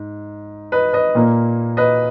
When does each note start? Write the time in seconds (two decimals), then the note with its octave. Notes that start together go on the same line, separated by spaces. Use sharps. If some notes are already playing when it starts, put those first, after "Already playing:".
Already playing: G#2
0.72 B4 D#5
0.93 B4 D#5
1.15 A#2 A#3
1.77 B4 D#5